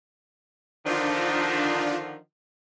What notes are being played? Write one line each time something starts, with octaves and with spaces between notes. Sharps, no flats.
D3 D#3 F3 D4 F4